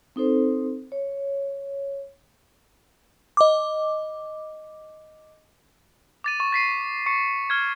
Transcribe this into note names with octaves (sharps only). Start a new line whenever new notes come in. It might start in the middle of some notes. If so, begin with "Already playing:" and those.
C4 D#4 A4 C5
C#5
D#5 D6
D6 A6 D#7
C#6
A6 B6 C7 D#7
C#6 C#7
F6 G#6